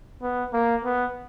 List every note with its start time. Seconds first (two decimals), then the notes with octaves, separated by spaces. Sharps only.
0.22 B3
0.53 A#3
0.85 B3